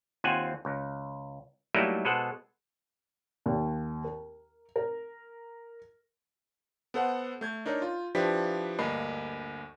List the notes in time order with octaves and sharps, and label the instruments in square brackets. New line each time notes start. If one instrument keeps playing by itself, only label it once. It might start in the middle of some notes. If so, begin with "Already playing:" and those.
[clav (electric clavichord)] D#2 C4 F4 C5 F#5 G#5
C#2
F#3 G3 A3 A#3 D#4 E4
B2 G#3 A4 C5 F#5
[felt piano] D#2
A#4
A#4
[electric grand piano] B3 A4 C5 F#5
A3 G6 G#6
D4 D#4 A#4 C#5
F4
F3 D4 E4 G4 B4 B6
D2 G2 A#3 D#5 B5 C7